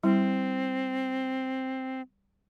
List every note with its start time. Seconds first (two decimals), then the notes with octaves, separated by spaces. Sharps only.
0.03 G3 C4 E4